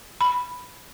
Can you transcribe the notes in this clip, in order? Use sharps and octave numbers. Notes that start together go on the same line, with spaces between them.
B5